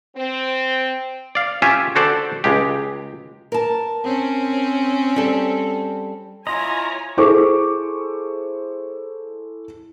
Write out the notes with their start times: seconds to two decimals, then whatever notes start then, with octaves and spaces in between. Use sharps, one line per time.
0.17 C4
1.35 D5 F5
1.62 C#4 F4 G4 E5 G#5
1.95 D3 F#4 A4 C5 D5
2.44 C#2 G#3 G4
3.52 A#4 A5
4.04 C4 C#4
5.16 G3 A4
6.47 E4 F4 C#5 D#5 G#5 A#5 C6
7.17 E4 G#4 A4 C5 C#6 D6